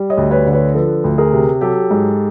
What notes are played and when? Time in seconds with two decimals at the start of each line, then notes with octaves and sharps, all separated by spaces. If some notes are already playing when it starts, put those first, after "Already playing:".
Already playing: G3
0.10 C#5 D#5
0.17 D2
0.31 B4 C#5
0.46 D3
0.53 B4 C#5
0.74 F3 A4 B4
1.04 D2
1.18 G#4 A#4
1.33 C3
1.61 F#3 G4 A4
1.91 G#2